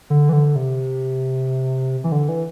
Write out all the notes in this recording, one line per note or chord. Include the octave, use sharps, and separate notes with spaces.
D3
E3
D3
C3
E3
D3
E3